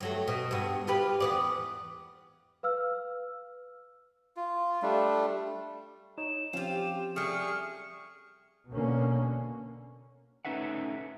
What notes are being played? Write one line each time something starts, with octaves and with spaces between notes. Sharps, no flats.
G2 F#3 A3
B2
G2 B3
F4 G4 B4
E2 B3 D5
B4 F5 E6 F6
F4
G3 A3 D4
D#4 C#5 E7
F3 C4 C#4 F4 G4
G3 A3 G#4 C#6 F6
B2 D3 A#3 C#4
A3 C#4 D#4 B4 E5 F#5